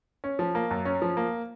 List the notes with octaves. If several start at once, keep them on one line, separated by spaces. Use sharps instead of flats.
C#4
F3
A#3
F#2
C#4
F3
A#3